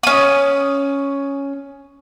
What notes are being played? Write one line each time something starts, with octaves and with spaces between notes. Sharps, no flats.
C#4 D#6